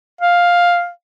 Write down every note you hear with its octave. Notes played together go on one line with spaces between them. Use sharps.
F5